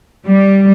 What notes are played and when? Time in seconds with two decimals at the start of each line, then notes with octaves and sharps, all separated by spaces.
0.27 G3